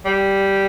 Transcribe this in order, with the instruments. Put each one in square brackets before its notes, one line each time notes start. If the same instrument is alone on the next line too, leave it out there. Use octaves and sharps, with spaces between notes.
[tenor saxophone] G3